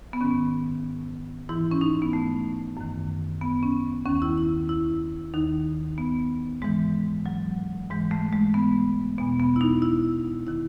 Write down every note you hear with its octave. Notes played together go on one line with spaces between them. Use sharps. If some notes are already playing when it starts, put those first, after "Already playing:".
B3
G#2 D#3 C#4
G#2 E3 E4
C#4
D#4
B3
A3
F#2 D#3
B3
C#4
D#2 D#3 C#4
E4
E4
E4
D#2 D#3 D#4
B3
G#2 E3 G#3
F#3
G#2 E3 G#3
A3
G#3
B3
E2 B2 B3
B3
E4
D#4
E4
D#3 E4